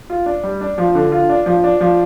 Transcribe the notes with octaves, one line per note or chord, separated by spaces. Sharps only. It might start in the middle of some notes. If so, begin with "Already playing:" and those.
F4
D4
G3
D4
F3
D3
F4
D4
F3
D4
F3